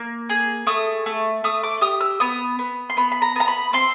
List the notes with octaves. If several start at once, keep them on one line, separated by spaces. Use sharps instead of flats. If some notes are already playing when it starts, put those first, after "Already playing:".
Already playing: A#3
G#4
A3 D#6
A3
A3 D#6
D6
G4 D#6
E6
B3 D#6
B3
C6
B3 B5
B5
A#5
B3 A#5
B5
C4 C6